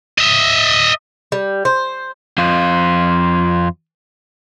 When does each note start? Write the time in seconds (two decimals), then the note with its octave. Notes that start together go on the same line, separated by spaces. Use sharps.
0.18 D#5 E5
1.32 G3
1.65 C5
2.38 F2 F4